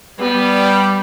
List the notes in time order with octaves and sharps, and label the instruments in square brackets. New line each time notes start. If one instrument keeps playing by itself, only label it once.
[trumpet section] G3 [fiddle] B3